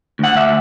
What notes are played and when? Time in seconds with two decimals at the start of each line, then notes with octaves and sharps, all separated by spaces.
0.19 D2 F#5
0.36 E5